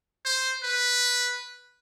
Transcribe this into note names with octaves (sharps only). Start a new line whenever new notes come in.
C5
B4